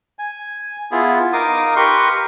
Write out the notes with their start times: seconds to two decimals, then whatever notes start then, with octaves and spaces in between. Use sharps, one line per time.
0.19 G#5
0.92 B3 E4 F4 G#4
1.33 D#4 A#4 F5 D6 D#6
1.76 G4 A#4 B4 C6 C#6